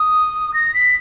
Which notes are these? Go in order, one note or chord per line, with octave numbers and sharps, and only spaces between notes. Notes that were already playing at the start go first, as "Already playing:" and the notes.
Already playing: D#6
A#6
B6